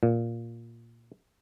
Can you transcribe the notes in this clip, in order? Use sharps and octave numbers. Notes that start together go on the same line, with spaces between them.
A#2